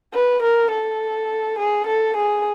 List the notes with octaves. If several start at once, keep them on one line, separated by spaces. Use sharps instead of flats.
B4
A#4
A4
G#4
A4
G#4